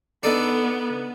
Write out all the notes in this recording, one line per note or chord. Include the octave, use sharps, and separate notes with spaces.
B3 D4 D#4 A4